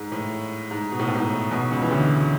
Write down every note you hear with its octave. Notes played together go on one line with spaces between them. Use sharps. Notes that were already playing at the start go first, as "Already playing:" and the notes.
Already playing: G#2
A2
G#2
B2
A2
G#2
A2
B1 B2
C#2 C#3
E3
D2 D3